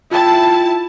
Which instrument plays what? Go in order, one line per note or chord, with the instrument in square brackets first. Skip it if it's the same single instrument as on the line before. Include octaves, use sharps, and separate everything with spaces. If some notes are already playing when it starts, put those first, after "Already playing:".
[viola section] E4 A5 [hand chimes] F4 G5